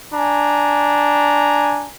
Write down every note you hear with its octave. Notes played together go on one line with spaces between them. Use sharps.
D4 G#5 A#5